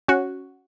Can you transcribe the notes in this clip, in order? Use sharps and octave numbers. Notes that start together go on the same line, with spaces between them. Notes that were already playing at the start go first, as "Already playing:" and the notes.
C#4 F#4